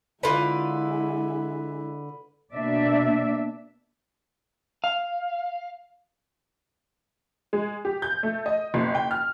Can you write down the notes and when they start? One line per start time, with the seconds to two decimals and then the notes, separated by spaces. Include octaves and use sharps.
0.23 D3 G#3 E4 F4 B4 F5
2.54 B2 A#3 D4 D5 E5
4.84 F5
7.53 G#3
7.85 G4
8.02 G6
8.23 A3
8.46 D#5
8.74 F#1
8.95 G5
9.11 F6